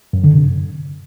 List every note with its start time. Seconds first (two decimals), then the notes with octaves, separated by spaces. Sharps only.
0.13 F#2
0.24 D3
0.34 C3
0.44 F#2